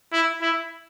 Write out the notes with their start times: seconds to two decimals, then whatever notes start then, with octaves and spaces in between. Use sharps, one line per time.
0.12 E4
0.41 E4